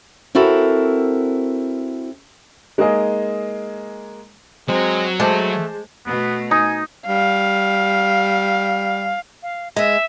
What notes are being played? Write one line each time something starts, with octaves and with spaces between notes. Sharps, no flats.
C4 E4 F#4 A4 A#4
G#3 A#3 D#4 G#4 D#5
F#3 G#3 C4
G#3 A3 C5 A5 D6
B2 A3 B3
D#4 G#5
G3 F5
F5
G#3 B4 E5